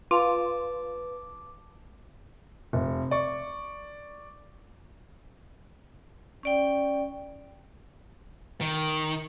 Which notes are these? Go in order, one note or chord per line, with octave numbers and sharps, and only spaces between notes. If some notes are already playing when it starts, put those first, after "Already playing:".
F4 B4 A5 D6
F1
D5 C#6
C#4 D5 G5
D#3